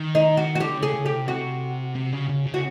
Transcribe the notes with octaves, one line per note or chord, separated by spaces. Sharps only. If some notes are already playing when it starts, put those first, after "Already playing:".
Already playing: D#3
D#4
F#4
F#4
D3 G4
C#3
G#4
C#3
G4
C3
C3 F#4
C3
C#3
C#3
C#3
F#4